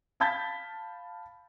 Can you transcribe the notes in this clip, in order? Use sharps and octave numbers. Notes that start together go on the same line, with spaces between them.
F5 A5 B5 G6 A6 B6